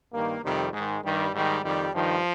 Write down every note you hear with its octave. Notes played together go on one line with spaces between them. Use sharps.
G2 D#3 A#3
F2 C3 D#3 G3
G#2 D#3 G#3
G2 D#3 G3
G#2 D#3 G3
F2 D#3 G3
G2 D#3 F3